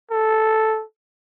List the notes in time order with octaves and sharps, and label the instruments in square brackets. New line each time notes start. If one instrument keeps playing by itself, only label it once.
[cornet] A4